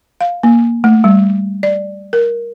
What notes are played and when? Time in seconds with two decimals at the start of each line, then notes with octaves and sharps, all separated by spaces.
0.21 F5
0.43 A#3
0.84 A3
1.04 G3
1.63 D5
2.13 A#4